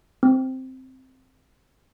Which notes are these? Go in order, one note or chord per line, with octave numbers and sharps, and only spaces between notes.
C4